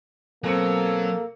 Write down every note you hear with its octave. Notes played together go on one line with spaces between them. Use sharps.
B2 F#3 A#3 C4 A4 C#7